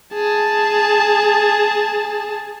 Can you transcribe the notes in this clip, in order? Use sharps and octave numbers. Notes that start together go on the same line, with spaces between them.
G#4 A5